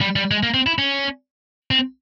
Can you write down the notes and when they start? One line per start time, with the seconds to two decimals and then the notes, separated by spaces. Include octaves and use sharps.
0.01 G3
0.16 G3
0.31 G#3
0.43 A#3
0.54 C4
0.66 E4
0.78 C#4
1.71 C4